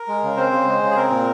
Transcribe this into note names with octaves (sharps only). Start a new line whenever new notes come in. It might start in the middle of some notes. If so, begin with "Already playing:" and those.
Already playing: A#4
G#3
C#3
C4 C5
C#3
G#3
C#3
G#4
C4 A#4
A#2